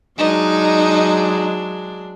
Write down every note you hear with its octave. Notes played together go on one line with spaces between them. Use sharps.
F#3 G#3 D4 D#4